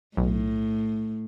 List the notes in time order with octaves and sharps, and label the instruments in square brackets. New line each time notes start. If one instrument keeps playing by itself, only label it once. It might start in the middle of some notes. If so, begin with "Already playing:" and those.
[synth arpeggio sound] B1 [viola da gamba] A2